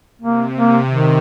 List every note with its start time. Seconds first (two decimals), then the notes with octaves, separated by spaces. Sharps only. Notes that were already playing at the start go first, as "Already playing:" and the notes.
0.21 C3 A#3
0.55 A#3
0.88 D#3